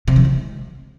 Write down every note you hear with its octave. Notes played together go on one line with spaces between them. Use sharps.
C3
E3
G#3